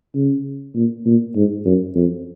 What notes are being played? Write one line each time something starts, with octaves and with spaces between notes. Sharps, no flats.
C#3
A#2
A#2
G#2
F#2
F2